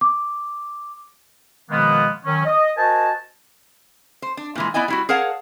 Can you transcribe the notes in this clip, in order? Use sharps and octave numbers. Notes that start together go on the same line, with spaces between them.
D6
B2 D#3 F3 G#3 A#3 B3
D#3 F#3 C#4
D#5
F#4 A#4 C5 D#5 G#5 A5
C5
D4
A#2 E3 G#3
B3 E4 D5 D#5 G#5
G3 E4 F#4
G#4 A#4 C#5 F5 F#5 A5